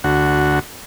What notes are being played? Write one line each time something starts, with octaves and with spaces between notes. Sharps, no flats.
D2 F#4